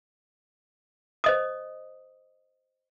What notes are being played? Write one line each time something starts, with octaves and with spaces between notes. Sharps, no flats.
C5 D#5 D#6